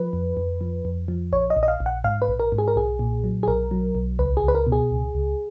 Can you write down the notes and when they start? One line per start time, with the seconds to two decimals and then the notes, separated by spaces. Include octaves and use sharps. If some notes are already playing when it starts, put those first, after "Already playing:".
Already playing: F3 B4
0.13 F2
0.37 F2
0.61 F3
0.85 F2
1.08 F3
1.32 A#1 C#5
1.50 D#5
1.57 A#1
1.63 D#5
1.68 F5
1.80 A#1
1.86 F#5
2.04 G#2 F5
2.22 B4
2.28 A#1
2.39 A#4
2.52 G#2
2.58 G#4
2.68 A#4
2.76 B1 G#4
2.99 A#2
3.24 F#3
3.43 G#4
3.47 B1 A#4
3.71 F#3
3.95 B1
4.19 C#2 B4
4.37 G#4
4.44 C#2 B4
4.55 A#4
4.67 B2
4.72 G#4
4.91 C#2
5.15 C#2